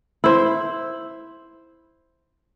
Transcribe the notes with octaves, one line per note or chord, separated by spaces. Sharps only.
E4 C5